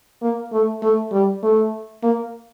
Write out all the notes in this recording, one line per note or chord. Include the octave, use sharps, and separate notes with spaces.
A#3
A3
A3
G3
A3
A#3